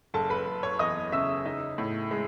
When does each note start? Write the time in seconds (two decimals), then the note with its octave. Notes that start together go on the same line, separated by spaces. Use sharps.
0.14 F#1 A4 A5
0.30 B4 B5
0.47 F#1
0.63 C#5 C#6
0.79 E2 D#5 D#6
1.12 C#3 E5 E6
1.46 D#4
1.78 A2
2.11 G#3